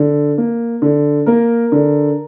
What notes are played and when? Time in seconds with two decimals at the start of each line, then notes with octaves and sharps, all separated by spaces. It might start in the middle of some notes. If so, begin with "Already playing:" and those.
Already playing: D3
0.38 A#3
0.82 D3
1.26 A#3 A#4
1.72 D3